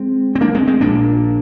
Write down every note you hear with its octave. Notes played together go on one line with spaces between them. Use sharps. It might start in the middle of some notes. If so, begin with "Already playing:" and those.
Already playing: G#3 C4
C4
A#3 D4
G#3 C4
G#3 C4
A#1 A#2 A#3 D4